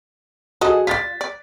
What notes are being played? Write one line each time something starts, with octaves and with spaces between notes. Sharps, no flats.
F#3 F#4 G#4 A4 D#5
F4 D5 A6 B6
D5